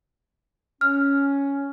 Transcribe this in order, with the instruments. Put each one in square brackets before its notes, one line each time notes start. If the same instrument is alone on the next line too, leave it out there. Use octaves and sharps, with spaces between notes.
[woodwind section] C#4 [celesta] F6